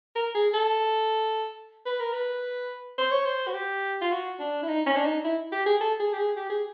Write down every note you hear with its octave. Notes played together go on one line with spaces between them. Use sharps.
A#4
G#4
A4
B4
A#4
B4
C5
C#5
C5
F#4
G4
F4
F#4
D4
E4
D#4
C#4
D4
D#4
E4
G4
G#4
A4
G#4
G4
G#4
G4
G#4